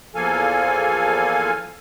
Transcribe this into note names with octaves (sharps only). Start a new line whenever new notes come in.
E2 F3 A#3 A4 F5 G#5